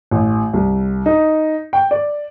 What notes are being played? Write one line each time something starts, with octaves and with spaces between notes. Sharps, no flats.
A1
C2
D#4
G5
D5